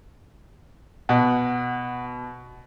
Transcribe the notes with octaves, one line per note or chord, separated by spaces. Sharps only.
B2 F#5